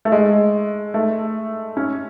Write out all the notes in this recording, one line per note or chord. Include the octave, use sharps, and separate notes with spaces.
A3
G#3
A3
C#4